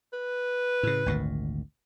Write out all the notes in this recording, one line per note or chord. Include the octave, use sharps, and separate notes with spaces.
B4
A2 C#3
G#1 D2 A#2